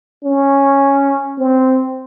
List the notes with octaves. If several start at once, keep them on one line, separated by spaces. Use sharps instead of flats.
C#4
C4